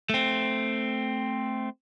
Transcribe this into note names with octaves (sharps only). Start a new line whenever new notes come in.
A3 C4